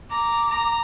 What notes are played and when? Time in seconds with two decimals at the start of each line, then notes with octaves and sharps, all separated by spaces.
0.11 A#5 D6
0.49 A#5